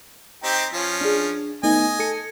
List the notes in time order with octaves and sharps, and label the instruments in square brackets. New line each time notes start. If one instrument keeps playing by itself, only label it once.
[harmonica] C4 D#4 G4
F3 C#4
[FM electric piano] D4 G#4
[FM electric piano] A3 B3 D#4 [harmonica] D#5 G#5
[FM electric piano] A4 D#6 C#7